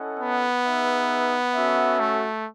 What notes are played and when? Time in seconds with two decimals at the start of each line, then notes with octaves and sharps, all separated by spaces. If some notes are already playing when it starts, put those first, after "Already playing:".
Already playing: C#4 E4 A4 D#5 F#5
0.19 B3
0.65 D#4 G#4 B4 E5
1.54 C#4 F#4 A4 E5
1.99 A3